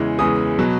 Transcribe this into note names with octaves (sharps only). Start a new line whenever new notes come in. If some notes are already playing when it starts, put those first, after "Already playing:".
Already playing: E2 C#3 E3 G#3
E2 C#3 E3 G#3 D#6
B2 F#3